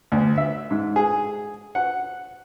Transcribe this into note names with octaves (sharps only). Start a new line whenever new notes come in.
D2
E5
G#2
G#4
F#5